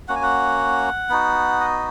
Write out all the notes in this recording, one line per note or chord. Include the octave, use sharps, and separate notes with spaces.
A#3 C#4 F#4 F#5
G#5
F#5
B3 D#4 F#4
D#5